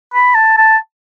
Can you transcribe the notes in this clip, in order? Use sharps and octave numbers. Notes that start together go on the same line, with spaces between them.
B5
A5
A5